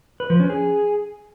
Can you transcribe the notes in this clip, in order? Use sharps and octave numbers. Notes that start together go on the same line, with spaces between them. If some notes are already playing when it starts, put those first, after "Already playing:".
B4
F3
C#4
G#4